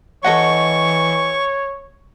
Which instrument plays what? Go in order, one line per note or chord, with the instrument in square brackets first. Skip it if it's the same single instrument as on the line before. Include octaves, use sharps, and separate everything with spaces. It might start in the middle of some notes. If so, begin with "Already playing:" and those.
[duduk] E3 [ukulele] A4 D#5 F#5 [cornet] C#5 [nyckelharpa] C#6